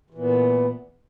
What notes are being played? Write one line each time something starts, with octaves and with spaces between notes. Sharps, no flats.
A#2 E3 B3